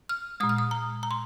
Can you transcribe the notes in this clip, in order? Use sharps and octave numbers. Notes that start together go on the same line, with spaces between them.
F6
A#2 G#3 D#6
F6
D#6
A#5
A#5
C6